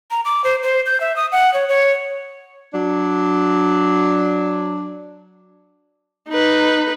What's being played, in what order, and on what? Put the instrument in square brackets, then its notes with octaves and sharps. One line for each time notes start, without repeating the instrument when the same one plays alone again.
[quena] A#5
D6
C5
C5
G6
E5
D#6
F#5
C#5
C#5
[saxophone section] F#3 D4
[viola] D#4 B4